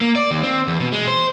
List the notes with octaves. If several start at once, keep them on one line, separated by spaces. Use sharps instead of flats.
A#3
D5
D#2
C4
E2
B2
G#3
C5